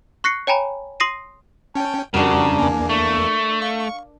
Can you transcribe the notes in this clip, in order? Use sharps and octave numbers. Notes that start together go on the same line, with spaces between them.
C#6 F#6 A#6 C7 C#7
C#5 G5 G#5 A#5 B5
C6 D#6 A#6 C7 D#7
C#4 G5 A5
F2 C#3 G3 D4 F#4 A#4
E2 A#3 G#5
A3 C#6
F5 C#6